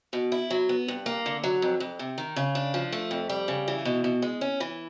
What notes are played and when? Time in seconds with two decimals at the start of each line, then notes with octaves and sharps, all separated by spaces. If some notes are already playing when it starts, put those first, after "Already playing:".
0.13 B2
0.32 E4
0.50 F#3
0.69 B3
0.88 G2
1.06 A#3
1.26 D3
1.44 F#3
1.62 F2
1.80 F2
1.99 C3
2.18 D#3
2.36 C#3
2.55 D4
2.74 F3
2.92 A3
3.11 F2
3.29 G3
3.48 C#3
3.68 E3
3.85 B2
4.04 B2
4.22 G#3
4.41 C#4
4.60 E3